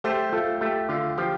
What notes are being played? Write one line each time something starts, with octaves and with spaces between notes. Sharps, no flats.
A3 G4 C5
A3 F4 A4
A3 G4
D3 F4
F3 G4